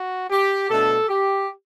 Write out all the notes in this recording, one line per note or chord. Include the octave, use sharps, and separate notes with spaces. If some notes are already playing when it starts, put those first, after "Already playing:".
Already playing: F#4
G4
B2 A3 D4 A4
G4